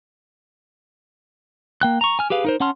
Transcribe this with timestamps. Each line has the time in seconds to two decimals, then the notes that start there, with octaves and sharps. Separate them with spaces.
1.81 A#3 G5 F#6
2.01 A#5 C#6
2.19 G#5 F6
2.30 G4 G#4 B4 F5
2.45 D#4 A#4 C5
2.60 C#4 F#5 A5 C6 F6